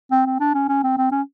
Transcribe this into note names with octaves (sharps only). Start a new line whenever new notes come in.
C4
C4
D4
C#4
C#4
C4
C4
C#4